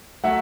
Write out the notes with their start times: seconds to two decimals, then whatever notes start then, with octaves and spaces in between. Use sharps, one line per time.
0.24 F#3 A3 E5 F#5